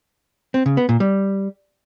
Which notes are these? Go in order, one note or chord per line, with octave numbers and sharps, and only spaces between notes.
C4
C#3
B3
A#2
G3